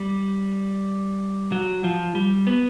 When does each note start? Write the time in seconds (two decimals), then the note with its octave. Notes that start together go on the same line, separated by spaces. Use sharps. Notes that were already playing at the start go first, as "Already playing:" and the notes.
Already playing: G3
1.52 F#3
1.84 F3
2.15 G3
2.47 B3